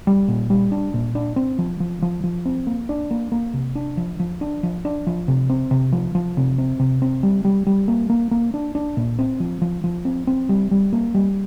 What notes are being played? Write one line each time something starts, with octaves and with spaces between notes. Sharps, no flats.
G3
A#2
G3
D4
A#2
D4
C4
F3
F3
F3
F3
C4
A#3
D4
A#3
A#3
C3
D4
F3
F3
D4
F3
D4
F3
C3
C4
C3
F3
F3
C3
C4
C3
C4
G3
G3
G3
A#3
A#3
A#3
D4
D4
A#2
C4
F3
F3
F3
C4
C4
G3
G3
A#3
G3